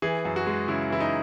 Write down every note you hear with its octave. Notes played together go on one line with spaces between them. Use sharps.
E3 G#4
F#2
F#4
G#3
C#3 E4
E3 E4
D#4